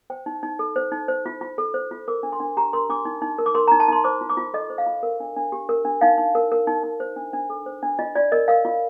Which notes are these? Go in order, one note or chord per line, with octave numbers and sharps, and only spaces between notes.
C5 G5
D#4
D#4
A4
C5
D#4
C5
F4
F4
A4
C5
F4
A#4 D6
D4
C6
D4
G4 A#5
A#4 C6
D4 D6
D#4
D#4
A#4
D6
A#4 C6
D#4 A#5
A5
D#4 C6
C5 D6
F4
D6
F4
A4 D#5
C5
F5
F4
A#4
D4
D4
G4
A#4
D4
D#4 F5
D#4
A#4
A#4
D#4
D#4
C5
D4
D4
A4
C5
D4
F4 D#5
F4 D5
A#4 D#5
A#4 F5
F4